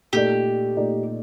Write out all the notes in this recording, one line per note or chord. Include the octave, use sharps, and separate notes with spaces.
A#2 A3 D#4 G4 A4 D5
A#2 A3 D#4 A4 D5